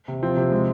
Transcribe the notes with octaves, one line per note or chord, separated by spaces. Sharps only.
C3
F3 C4
C3
G#3